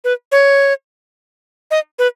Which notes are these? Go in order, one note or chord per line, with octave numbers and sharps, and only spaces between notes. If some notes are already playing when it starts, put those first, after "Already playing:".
B4
C#5
D#5
B4